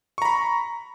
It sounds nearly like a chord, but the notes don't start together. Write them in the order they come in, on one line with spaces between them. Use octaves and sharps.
C#6 A#5 B5